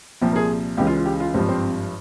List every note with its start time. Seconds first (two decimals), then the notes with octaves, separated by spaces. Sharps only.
0.21 C2 A#2 F3 G4
0.32 A#4
0.36 G#4
0.77 C#2 C#3 E3 G4
0.87 F4
0.97 F4
1.06 G4
1.20 F4
1.34 G#1 G2 F3 C4
1.48 C4